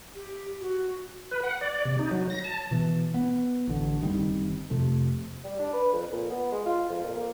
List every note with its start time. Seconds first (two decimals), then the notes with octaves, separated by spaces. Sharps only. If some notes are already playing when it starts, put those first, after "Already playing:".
0.15 G4
0.61 F#4
1.31 B4
1.43 F#5
1.61 D5
1.85 C3
1.99 D#4
2.11 F#3
2.30 A#6
2.44 A5
2.71 B2 E3
3.14 B3
3.68 A1 D3
4.01 F#1 D#3 G3 C4
4.70 F2 C3 A3
5.44 G3
5.59 D4
5.73 B4
5.92 F2
6.12 A#2
6.30 B3
6.52 G#3
6.66 F4
6.89 F2
7.04 A#2
7.16 A#3